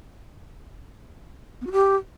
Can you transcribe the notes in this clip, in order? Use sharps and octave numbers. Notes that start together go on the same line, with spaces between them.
B3
F#4
G4